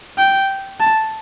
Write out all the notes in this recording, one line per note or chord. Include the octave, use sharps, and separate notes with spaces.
G5
A5